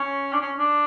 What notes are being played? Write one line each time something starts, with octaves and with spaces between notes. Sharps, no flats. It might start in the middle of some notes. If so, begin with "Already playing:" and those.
Already playing: C#4
D4
C#4
D4